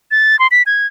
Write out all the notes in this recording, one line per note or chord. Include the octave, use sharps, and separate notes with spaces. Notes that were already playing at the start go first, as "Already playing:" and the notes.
A6
C6
B6
G#6